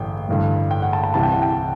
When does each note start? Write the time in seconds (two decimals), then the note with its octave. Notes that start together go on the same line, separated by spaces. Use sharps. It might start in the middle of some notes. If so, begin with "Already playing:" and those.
Already playing: A1 G2 D3 G5
0.29 A1 G2 D3
0.71 G5
0.82 F#5
0.93 A5
1.04 A5
1.14 C2 C3 E3 A5
1.23 G5
1.33 F#5
1.42 G5